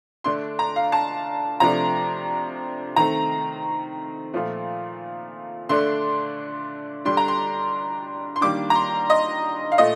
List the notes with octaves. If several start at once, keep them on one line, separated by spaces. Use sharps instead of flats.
D3 A3 D4 C6
A#5
F5
A5
C3 F3 A3 D4 A#5
D#3 A3 C4 A#5
A#2 F3 A3
D3 A3 D4 C6
D3 G3 D4 C6
A#5
C6
C6
D#3 G3 A#3 D4 D6
A#5
C6
D#5
F5
A#2 A3 D#5